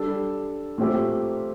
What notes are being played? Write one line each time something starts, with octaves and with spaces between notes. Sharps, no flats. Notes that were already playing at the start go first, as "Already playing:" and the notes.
Already playing: G3 D4 A4
A#2 A3 C4 G4